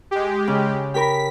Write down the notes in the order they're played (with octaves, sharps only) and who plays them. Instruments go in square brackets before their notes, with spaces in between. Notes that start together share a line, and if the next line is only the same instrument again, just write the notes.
[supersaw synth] G#3 G4
[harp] C#3
[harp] G4 A#4 B5 [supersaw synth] B6